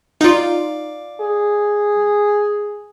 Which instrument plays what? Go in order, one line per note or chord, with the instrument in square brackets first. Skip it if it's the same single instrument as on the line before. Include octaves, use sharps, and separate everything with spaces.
[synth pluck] D#4 F4 [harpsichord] D5 F5
[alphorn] G#4